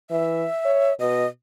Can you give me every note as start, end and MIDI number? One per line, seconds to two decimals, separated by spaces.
0.10 0.45 52
0.10 0.94 76
0.65 0.92 73
1.00 1.25 47
1.00 1.27 75